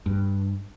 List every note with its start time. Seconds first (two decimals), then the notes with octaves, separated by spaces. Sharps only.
0.06 G2